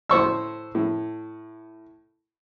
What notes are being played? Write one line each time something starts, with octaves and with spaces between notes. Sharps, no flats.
A2 C5 C#6 E6
A2